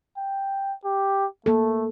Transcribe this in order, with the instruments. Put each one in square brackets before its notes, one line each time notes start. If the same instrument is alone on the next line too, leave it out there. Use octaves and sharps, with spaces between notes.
[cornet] G5
G4
[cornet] A3 [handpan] A#3 A4